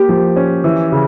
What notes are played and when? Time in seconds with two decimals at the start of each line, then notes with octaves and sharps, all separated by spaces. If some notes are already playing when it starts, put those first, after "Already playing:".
Already playing: A#3 G4
0.09 F3
0.36 C#4
0.64 E3
0.92 C#3